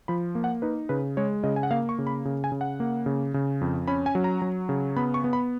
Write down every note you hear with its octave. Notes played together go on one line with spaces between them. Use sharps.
F3 B5
A#3
F#5
D#4 B4
C#3 B4
G#3 C#5
C#3 D#5
G#5
F#5
A#3 F5
C#6
C#3
B5
C#3
G#5
C#3
F#5
A#3
C#3
C#3
F2
C#4 B5
G#5
F#3
A#5
F#3
C#3
B3 B5
C#6
B3
B5